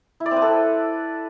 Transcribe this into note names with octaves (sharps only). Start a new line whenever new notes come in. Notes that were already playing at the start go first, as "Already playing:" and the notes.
E4
D5
C4
B4
A4